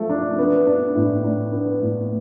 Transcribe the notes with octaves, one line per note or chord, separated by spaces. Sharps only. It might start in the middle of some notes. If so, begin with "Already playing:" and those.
Already playing: F3 A3
D4
B3
D4
A2
D4
B3
A2